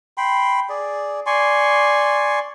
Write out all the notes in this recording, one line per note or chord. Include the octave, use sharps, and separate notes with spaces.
G5 B5 C6
G#4 D5
D5 G#5 C6 C#6